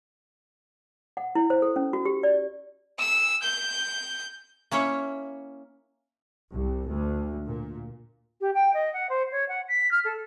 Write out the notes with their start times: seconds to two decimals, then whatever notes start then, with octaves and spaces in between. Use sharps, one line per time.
1.17 F#5
1.35 E4
1.50 C5
1.62 A4
1.76 C#4
1.93 F#4
2.05 G4
2.23 D5
2.99 E6
3.43 G6
4.71 A#3 C#4 E4 C#5
6.50 C2
6.90 D2
7.45 A#2
8.41 G4
8.54 G5
8.74 D#5
8.93 F#5
9.09 C5
9.32 C#5
9.48 F#5
9.68 B6
9.91 F6
10.04 A4